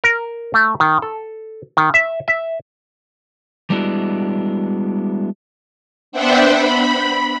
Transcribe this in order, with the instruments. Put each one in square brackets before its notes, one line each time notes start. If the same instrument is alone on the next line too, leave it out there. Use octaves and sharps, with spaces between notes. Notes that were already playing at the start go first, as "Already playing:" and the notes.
[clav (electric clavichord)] A#4
A3
D#3
A4
D#3
E5
E5
[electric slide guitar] G3 G#3 B3 D4 E4 F#4
[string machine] B3 D4 C5 E5 F#5 G5
B5